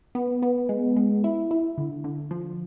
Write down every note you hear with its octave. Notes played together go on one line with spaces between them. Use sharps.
B3
B3
G#3
G#3
E4
E4
D3
D3
F3